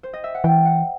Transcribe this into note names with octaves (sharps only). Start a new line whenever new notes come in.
C5
D#5
E5
F#5
E3 G5
F#5